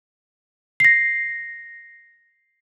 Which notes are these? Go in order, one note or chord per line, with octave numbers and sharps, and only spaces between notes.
A#6 C7